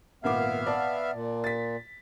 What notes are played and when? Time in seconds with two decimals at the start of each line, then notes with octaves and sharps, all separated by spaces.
0.24 G#1 A#2 B3 E5 F5 D6
0.66 D5 A5
1.13 A#2
1.44 A6 B6